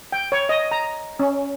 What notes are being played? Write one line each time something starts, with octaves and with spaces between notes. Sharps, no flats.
G5
C#5
D#5
A#5
C#4